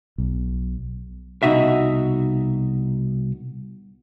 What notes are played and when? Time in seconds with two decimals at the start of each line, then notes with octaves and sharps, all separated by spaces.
0.18 B1
1.43 C2 B2 D#4 F#4 E5